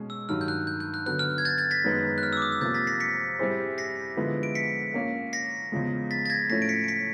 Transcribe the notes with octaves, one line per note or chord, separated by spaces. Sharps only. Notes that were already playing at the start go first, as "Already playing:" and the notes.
Already playing: B2 G#3 C#4
E6
G2 D#3 F#3 F6
G6
F#6
G6
G6
F#6
D3 F#3 B3 F#6
F6
G#6
G6 A6
G6 A6
A6 B6
F#2 D#3 G#3 B3
F#6
F6
E6
D6
D#6
E6
C3 F3 A#3 G6 A6
A6 B6
A#6 C7
B6 C#7
G3 C4 E4 G#4 C5
A#6 C7
D3 F3 G#3 B3 E4
D7
B6 C#7
A#3 C#4 F4
A#6 C7
E2 C#3 F3 G#3
A6 B6
A6
G#6 A#6
A2 F3 A3 C#4 A#6 C7
D7
B6 C#7
D7
B6 C#7